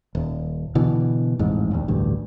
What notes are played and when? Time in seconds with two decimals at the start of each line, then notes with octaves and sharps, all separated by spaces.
0.15 D#1
0.75 B2 D3 E3
1.39 A1 F2 G#2 G#3
1.71 A#1 D#2
1.88 A1 D2 G2